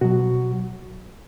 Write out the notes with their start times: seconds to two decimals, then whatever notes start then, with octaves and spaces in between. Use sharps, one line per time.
0.01 B2 F#3 F#4